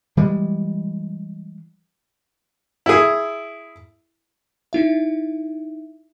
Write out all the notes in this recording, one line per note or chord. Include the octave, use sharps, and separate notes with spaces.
E3 G3 G#3
E4 G#4
D#4 E4 E5